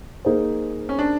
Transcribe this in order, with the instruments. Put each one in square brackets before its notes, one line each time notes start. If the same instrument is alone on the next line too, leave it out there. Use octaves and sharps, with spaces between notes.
[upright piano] A#3 D#4 G#4 C5
[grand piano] C#4
D4